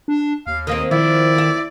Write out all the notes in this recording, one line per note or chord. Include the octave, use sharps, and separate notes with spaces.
D4
D#2 F5
D#3 A#3 C4 D#5
D#3 F3 E4 D5
D#2 E5